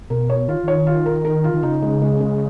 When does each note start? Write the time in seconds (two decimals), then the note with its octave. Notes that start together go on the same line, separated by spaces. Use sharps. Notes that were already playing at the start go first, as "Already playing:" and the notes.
0.10 B2 A#4
0.30 C#5
0.48 D#3 F4
0.64 D#3 C#5
0.87 F4
1.06 A#4
1.25 A#4
1.44 F4
1.54 D#3
1.63 C#3 D#4
1.82 G#3
2.02 G#3
2.20 G#3